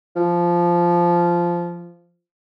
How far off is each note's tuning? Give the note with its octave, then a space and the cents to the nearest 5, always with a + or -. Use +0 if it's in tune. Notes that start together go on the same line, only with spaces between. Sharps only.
F3 -10